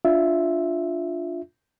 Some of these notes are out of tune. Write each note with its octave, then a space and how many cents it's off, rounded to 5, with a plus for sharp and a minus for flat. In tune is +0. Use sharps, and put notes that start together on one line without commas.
D4 +0 F4 +0 E5 +0